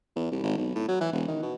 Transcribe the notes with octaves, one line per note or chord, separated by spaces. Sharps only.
E2
C2
G#1
B1
A2
F#3
E3
E1
D#3
B2